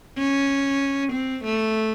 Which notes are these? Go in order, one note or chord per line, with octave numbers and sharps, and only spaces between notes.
C#4
C4
A3